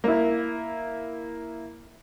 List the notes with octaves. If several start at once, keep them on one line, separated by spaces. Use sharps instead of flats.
A#3 E4